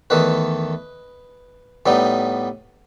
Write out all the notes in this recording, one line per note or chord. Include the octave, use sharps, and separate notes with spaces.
E2 D#3 A3 B4 D#5
A2 G3 B3 D#4